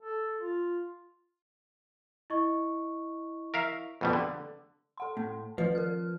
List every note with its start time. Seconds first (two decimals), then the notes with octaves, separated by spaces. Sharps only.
0.02 A4
0.40 F4
2.30 E4 D#5 C#6
3.54 A#4 E5 F5
4.01 F2 B2 G3
4.13 D3
4.98 A4 F#5 C6
5.17 A2
5.58 D#3 F3 A3 B4
5.75 A#4 F6